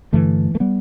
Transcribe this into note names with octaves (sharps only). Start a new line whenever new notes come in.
G2 D3 E3 A3
A3
G3 B3